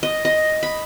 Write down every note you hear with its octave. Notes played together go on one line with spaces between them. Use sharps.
D#5
D#5
B5